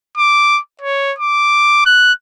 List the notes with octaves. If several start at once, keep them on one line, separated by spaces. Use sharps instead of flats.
D6
C#5
D6
F#6